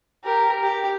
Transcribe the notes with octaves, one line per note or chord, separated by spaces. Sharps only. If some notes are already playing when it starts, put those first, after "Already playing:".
G4 A#4
G4